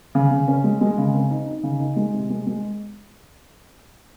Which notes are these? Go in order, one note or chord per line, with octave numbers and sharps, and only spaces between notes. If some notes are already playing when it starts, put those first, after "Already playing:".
C#3
C#3
C#4
G#3
G#3
C#3
C4
D#4
D#4
C#3
D#4
G#3
C3
G#3
G#3